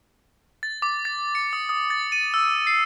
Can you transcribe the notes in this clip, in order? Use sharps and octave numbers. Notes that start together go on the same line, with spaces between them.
A6
D6
A6
C#7
D#6
D#6
A6
D#7
E6
C7